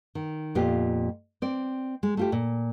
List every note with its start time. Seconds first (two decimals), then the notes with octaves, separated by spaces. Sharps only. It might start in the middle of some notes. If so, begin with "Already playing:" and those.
0.15 D#3
0.55 F2 A#2 B3 F4 G4
1.42 C4 D5
2.03 G#3
2.17 A3 F4 G4
2.32 A#2